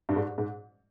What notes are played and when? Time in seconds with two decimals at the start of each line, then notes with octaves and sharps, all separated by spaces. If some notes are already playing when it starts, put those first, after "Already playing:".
0.09 G2
0.16 G#2
0.38 G#2